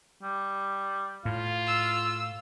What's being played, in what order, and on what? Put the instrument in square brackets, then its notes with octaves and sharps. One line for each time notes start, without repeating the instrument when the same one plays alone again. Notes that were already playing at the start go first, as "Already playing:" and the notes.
[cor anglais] G3
[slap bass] A2 [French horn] F4 [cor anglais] F5
[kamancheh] E6